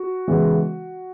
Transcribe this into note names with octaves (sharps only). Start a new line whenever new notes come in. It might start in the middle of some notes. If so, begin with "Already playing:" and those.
Already playing: F#4
C#3 E3 G#3 B3